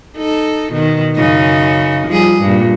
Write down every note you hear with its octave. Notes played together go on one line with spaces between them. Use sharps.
D#4 A4
B2 D#3
F#2 C#3 D#4
F3 G3 G#4
G2 A#2